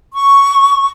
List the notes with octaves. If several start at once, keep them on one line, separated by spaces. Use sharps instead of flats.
C#6